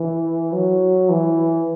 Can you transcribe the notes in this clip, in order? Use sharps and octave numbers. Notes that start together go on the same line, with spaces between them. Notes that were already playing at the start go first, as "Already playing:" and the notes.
Already playing: E3
F#3
E3